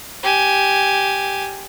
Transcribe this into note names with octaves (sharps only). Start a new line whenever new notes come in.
G4 G#5